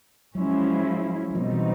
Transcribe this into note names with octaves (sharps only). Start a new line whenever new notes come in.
F3 F#3 G#3 C#4 E4
F#3
B2 F3 G3 C4 D#4
E3